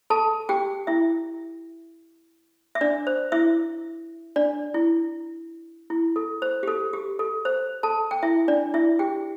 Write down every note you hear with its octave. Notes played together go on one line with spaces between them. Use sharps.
A4 A5
G4 G5
E4 E5
E5
D4 D5
C5
E4 E5
D4 D5
E4
E4
A4
C5
G4
A4
G4
A4
C5
A4 A5
G5
E4 E5
D4 D5
E4 E5
G4 G5